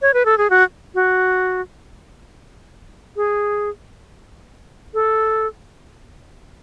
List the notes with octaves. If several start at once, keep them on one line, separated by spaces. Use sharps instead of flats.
C#5
B4
A4
G#4
F#4
F#4
G#4
A4